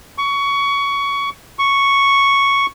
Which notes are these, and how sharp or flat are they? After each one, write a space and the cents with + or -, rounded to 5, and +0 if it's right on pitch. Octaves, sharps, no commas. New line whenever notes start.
C#6 +20
C#6 +0